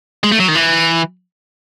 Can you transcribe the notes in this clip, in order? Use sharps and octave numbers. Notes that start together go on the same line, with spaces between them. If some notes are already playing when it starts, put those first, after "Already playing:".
G#3
A3
F#3
D#3
E3